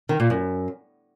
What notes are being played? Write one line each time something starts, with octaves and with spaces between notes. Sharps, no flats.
D#3
A#2
F#2